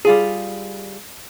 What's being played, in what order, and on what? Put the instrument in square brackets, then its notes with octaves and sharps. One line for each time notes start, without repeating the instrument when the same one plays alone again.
[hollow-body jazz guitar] G3 F4 G#4